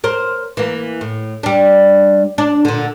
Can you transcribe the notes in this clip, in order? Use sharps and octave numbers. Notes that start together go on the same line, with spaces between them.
A#4 C5
E3 A#3
A2
G3 D4
D4
A#2 D3